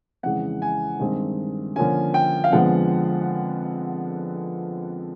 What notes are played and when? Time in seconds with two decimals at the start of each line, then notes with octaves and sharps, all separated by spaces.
0.23 F2 C#3 E3 G#3 F#5
0.62 G#5
0.99 G2 D#3 G#3 C4
1.76 D3 F3 A#3 C#4 G#5
2.14 G5
2.44 F5
2.52 F2 D3 F3 G#3 B3 F#5